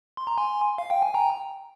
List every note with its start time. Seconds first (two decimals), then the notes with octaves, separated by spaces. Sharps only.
0.17 C6
0.27 A#5
0.38 G#5 C6
0.78 F5
0.90 G5
1.02 G#5
1.14 G5 A#5